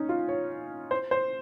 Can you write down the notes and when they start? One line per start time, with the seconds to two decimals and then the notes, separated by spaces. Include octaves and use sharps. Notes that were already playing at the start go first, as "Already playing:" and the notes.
Already playing: C#4 D#4
0.09 F4
0.29 C#5
0.91 C5
1.11 C5